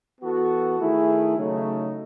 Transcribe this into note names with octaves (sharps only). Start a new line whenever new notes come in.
E3 B3 F#4 A4
D#3 A3 E4 G#4
C#3 F#3 A3 D#4